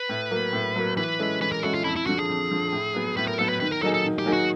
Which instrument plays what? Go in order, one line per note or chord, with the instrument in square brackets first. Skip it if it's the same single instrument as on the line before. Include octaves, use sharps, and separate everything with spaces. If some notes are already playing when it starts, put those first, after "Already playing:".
Already playing: [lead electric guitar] B4
[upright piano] A2
F#3 A#3
A2
F#3 A#3
[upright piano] E3 [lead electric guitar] B4
[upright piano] G#3 C#4 E4 A4
[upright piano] E3 [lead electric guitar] B4
[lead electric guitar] A#4
[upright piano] G#3 C#4 E4 A4 [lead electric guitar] F#4
[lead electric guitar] F4
[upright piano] F2 [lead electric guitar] E4
[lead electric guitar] E4
[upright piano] D3 F3 [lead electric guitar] F#4
[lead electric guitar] G#4
[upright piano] F2
D3 F3
A2
F#3 B3
[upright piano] A2 [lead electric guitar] B4
[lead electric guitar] A#4
[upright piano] F#3 B3 [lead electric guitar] A4
[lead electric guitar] B4
[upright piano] D#3 [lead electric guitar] B4
[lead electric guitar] A#4
[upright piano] F#3 A#3 D#4 G#4 [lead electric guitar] A4
[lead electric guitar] A4
[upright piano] D#3
[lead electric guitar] G4
[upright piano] F#3 A#3 D#4 G#4
[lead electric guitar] F#4